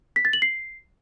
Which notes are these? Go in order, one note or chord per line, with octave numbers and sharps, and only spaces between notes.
B6
A6
F#7
C7